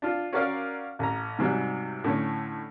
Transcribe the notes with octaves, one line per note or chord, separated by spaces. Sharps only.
D4 F4
C#4 F#4 A#4 D5 F5
A1 A#5
G#2 C3 F#3 G3
A2 D3 C#4